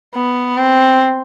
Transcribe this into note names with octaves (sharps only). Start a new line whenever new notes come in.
B3
C4